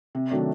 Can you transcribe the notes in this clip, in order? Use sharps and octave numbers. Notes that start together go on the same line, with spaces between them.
C3
D#3 F#3 A3 D4